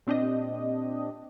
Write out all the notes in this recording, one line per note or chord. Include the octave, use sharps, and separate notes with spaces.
A#2 C4 D4 G4 D#5